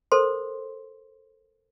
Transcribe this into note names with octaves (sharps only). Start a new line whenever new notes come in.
A4 A#4 C5 C6